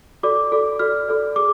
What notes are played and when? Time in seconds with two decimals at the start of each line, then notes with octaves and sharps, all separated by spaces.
0.23 F#4 A4 D5 D6
0.52 F#4 A4 D5
0.79 F#4 A4 D5 F6
1.09 F#4 A4 D5
1.36 G#4 D6